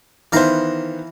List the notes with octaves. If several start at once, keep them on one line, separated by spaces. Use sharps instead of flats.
D#3 E3 B3 C5 F5 A#5